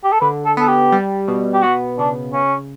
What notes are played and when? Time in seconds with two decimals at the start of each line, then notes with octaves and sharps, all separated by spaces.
0.04 G4
0.12 A4
0.21 D3 B4
0.45 A4
0.57 B3 A4
0.68 G4
0.92 G3
1.28 B2
1.54 G4
1.63 B3 F#4
1.99 C#3 D4
2.33 C#3 C#4